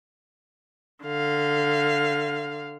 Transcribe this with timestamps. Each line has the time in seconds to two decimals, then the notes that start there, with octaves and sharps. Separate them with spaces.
1.04 D3 F5